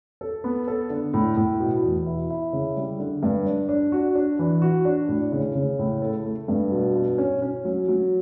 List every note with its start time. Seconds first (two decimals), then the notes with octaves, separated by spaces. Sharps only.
0.21 A4
0.44 B3
0.68 A4
0.90 D3
1.14 A2
1.37 A2
1.60 B2
1.83 E2
2.06 E4
2.30 E4
2.53 C#3
2.77 G3
2.99 D3
3.23 G2
3.46 D4
3.69 D4
3.92 F#4
4.15 D4
4.39 E3
4.62 F#4
4.85 D4
5.08 A2
5.32 C#3
5.55 C#3
5.79 A2
6.02 A4
6.25 A3
6.48 G2
6.71 B2
6.95 B2
7.18 C#4
7.42 C#4
7.65 F#3
7.88 F#3